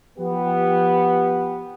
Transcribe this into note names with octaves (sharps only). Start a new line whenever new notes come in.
F3 B3 G4